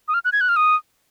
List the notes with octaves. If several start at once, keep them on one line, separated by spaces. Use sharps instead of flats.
D#6
F6
F#6
G#6
F#6
F6
D#6